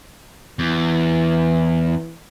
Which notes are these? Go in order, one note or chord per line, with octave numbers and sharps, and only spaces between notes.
E2 E3